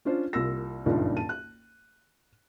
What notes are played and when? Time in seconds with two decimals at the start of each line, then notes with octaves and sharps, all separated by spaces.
0.05 C#4 D4 F4 C5
0.33 C2 A#3 F4 E6 A#6
0.86 F#1 C#2 G2 A#2 D#3 F3
1.16 A5 D#7
1.29 F#6